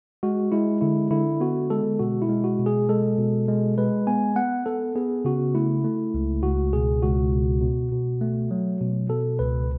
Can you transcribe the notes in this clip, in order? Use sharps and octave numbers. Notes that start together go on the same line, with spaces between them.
G#3 F#4
G#3 E4
D3 E4
D3 E4
B3 F#4
G#3 A4
B2 F#4
E4
G#3
F#4
B2
G#4
G#3 A4
B2
G#3
G#3 B4
B3 G#5
B3 F#5
B3 A4
B3 G#4
C#3 F#4
A3 E4
A3
C#2
C#2 F#4
B2 G#4
C#2 F#4
B2
B2
B2
A3
F#3
B2
B2 A4
C#2 B4